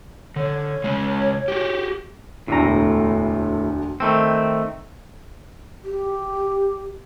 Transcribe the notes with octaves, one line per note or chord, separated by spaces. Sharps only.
D3 C#5
C#3 G#3
F#4 G4
E1 D2 A2 D3 A#5
D#3 A3 C4
G4